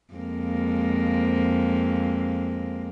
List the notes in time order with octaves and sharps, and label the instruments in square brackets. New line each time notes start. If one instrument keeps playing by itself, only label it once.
[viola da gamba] F2 G#3 A#3